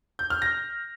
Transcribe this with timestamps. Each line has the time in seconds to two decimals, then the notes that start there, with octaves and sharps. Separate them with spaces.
0.19 G6
0.30 F6
0.42 A#6